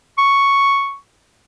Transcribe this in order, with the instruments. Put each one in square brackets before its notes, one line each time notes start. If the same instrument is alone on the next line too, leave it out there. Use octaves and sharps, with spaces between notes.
[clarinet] C#6